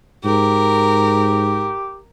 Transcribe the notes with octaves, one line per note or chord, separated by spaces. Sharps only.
G#2 G4 A#4